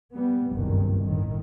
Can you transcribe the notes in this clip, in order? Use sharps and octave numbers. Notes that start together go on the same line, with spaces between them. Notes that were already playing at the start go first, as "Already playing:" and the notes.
G3 B3
F#1 C2 G2 D#3
G1 A2 D#3